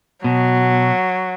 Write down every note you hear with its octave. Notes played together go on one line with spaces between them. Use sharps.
B2 F#3